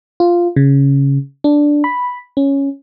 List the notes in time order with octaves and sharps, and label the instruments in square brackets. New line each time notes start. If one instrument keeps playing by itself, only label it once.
[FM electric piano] F4
C#3
D4
B5
C#4